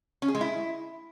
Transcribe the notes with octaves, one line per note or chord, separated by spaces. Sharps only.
C#4
G#4
G#3
E4